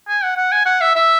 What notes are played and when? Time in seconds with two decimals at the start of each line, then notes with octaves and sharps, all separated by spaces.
0.09 G#5
0.23 F#5
0.37 F#5
0.52 G#5
0.65 F#5
0.81 E5
0.95 E5